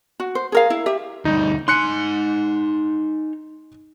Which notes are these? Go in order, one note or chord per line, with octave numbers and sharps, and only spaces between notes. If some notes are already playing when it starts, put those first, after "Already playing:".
F#4
C5
G#4 A#4 F5
E4
G4 E5
D2 G3 D#4
D#4 G#5 C6 F#6 C#7